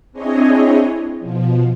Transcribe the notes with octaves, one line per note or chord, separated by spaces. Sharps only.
C4 D4 E4 G#4 C#5 D#5
B2 F3